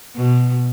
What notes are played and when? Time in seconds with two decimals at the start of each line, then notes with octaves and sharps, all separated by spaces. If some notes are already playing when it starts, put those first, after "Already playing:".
0.16 B2